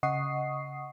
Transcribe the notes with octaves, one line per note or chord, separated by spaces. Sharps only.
C#3 D#5 F#5 C#6 D#6 C7